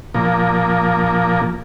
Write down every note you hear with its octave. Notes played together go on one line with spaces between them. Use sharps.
A#2 F3 A#3